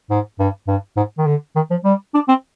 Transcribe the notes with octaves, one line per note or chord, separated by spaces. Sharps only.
G#2
G2
G2
G#2
D#3
D3
D#3
F3
G3
D4
C4